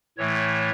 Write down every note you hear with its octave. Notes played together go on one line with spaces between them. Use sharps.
A2 E3 A3 C#5